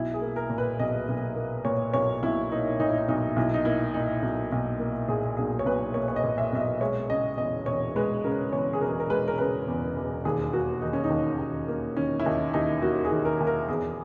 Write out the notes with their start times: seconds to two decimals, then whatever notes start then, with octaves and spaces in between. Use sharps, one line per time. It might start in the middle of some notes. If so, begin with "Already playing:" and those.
Already playing: B1 E4
0.14 G#4
0.22 A#3
0.36 A#4
0.50 A#2
0.58 B4
0.79 B1 D#5
1.08 B1
1.36 A#3
1.65 A#2 C#5
1.94 B1 C#5
2.23 B1 E4
2.50 A#3 D#4
2.79 A#2 D#4
2.89 E4
2.98 D#4
3.08 B1 D#4
3.36 B1 E4
3.54 D#4
3.65 A#3 E4
3.94 A#2 D#4
4.22 B1
4.52 B1
4.80 A#3
5.08 A#2 G#4
5.37 B1 G#4
5.59 C#5
5.66 B1 B4
5.94 A#3 C#5
6.08 C#5
6.16 D#5
6.24 A#2
6.38 E5
6.53 B1 E5
6.59 D#5
6.81 G#3 C#5
7.09 C#3 D#5
7.38 E2 D#5
7.66 E1 C#5
7.96 G#3 B4
8.24 C#3 A#4
8.53 E2 C#5
8.73 G#4
8.81 E1 A#4
9.00 A#4
9.10 G#3 B4
9.28 A#4
9.38 C#3 B4
9.68 E2
9.96 E1
10.25 D#2 G#4
10.53 A#3 F#4
10.81 D#3 D#4
10.93 C#4
11.04 D#4
11.10 D#2
11.39 D#2
11.68 A#3
11.97 D#3 C#4
12.20 E4
12.25 D#2 D#4
12.54 D#2 D#4
12.82 A#3 F#4
13.05 G#4
13.11 D#3
13.25 A#4
13.40 D#2
13.47 A#4
13.68 E2 G#4